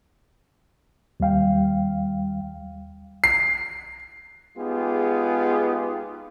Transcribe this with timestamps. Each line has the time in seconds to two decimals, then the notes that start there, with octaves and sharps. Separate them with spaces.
1.20 D#2 G3 F5 G5
3.24 C7
4.57 G#3 B3 D#4 F4 G4 G#4